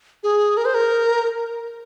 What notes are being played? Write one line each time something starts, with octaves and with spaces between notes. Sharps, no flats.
G#4
A#4
C5
A#4